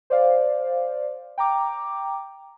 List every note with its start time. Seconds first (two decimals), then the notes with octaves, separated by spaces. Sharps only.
0.10 C5 D5 F5
1.38 G5 A#5 D6